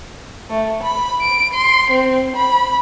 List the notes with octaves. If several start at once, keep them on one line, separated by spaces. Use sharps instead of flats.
A3
B5
D7
C6
C4
B5